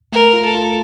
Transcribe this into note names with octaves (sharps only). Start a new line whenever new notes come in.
A3 A#4
F4
A4
F4